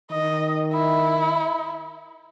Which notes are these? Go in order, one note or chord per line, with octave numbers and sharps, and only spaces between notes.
D#3 D#5
E4